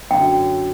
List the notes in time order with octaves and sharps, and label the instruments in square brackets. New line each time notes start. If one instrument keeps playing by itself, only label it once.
[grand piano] F#2 D3 F#3 [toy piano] G5